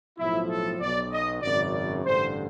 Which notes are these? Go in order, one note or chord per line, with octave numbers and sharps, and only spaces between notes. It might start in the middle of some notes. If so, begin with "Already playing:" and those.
B1 A2 F3 E4
A4
B1 B2 D5
D#5
G#1 F#2 C#3 D5
D5
A1 G2 D3 C5